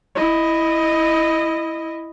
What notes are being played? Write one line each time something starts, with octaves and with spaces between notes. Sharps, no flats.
E4 D#5